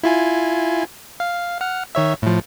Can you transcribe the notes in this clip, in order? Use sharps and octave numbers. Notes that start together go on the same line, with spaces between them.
E4 F4 G#5
F5
F#5 F6
D#3 C#5 E5
A2 F3